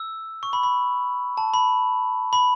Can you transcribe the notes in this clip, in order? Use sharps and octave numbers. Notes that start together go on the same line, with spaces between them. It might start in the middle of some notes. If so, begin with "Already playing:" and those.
Already playing: E6
C#6
B5
B5
A5
B5
B5